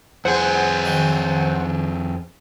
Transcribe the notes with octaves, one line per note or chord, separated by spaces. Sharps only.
F2 G#4 C5 F#5
D#3 F#3